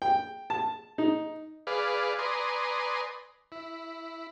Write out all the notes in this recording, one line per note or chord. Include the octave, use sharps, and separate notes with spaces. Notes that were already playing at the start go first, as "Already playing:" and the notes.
G5
A5
D#4
G#4 B4 D5 F5
B4 D5 G#5 A#5 C6 D#6
E4